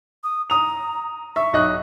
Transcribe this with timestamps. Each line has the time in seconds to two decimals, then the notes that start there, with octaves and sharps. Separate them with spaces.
0.24 D#6
0.50 A#5 D#6 F7
1.36 E5 C#6
1.53 B1 D#5 F#6